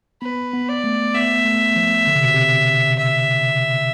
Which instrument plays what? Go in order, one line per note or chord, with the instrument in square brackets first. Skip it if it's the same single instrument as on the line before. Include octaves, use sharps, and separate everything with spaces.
[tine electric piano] B3 [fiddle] B4
[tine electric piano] B3
[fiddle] D5
[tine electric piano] A3
[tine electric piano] B3 [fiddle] E5
[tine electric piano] A3
F3
D3
C3
B2
C3
[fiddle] E5